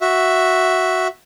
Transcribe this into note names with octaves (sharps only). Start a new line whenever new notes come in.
F#4 E5